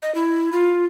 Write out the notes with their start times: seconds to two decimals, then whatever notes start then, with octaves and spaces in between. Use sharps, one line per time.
0.03 D#5
0.15 E4
0.52 F4